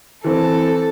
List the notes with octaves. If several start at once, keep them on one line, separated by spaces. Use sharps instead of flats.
E3 C4 A4